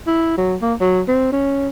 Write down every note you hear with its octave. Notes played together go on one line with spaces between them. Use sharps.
E4
F#3
A#3
F#3
C4
C#4